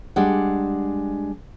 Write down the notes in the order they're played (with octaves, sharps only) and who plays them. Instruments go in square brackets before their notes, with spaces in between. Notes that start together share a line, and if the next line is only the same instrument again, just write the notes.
[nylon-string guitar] G3 G#3 D4 F#5